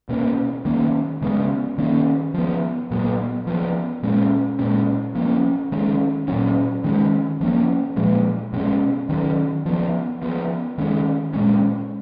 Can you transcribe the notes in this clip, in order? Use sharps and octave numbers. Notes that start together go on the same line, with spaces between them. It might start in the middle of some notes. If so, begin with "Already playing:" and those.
B2 A#3 C#4
D#3 A#3 C#4
C#3 G#3 B3
D#3 A#3 C#4
F3 B3
A#2 F#3 B3
F3 B3
A#2 G#3 C#4
A#2 G#3 C#4
F3 A#3 C#4
D#3 G#3 C#4
A#2 F#3 C#4
D#3 G#3 C#4
F3 A#3 C#4
A#2 F3 G#3
B2 G#3 C#4
D#3 F#3 C#4
F3 B3
F3 B3
D#3 G#3 C#4
A#2 G#3 C#4